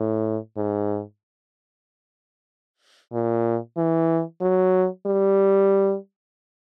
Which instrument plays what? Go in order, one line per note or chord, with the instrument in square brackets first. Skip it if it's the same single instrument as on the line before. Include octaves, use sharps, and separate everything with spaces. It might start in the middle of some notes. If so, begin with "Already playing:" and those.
Already playing: [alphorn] A2
G#2
A#2
E3
F#3
G3